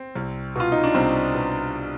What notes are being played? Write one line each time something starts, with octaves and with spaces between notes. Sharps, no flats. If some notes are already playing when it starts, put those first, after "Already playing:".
Already playing: C4
C2
B2 F4
D#4
D4
C2 C4
B2